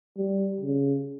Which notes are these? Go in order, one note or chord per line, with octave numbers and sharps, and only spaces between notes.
G3
C#3